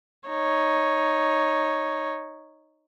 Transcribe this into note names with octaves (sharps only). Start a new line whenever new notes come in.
D#4 C#5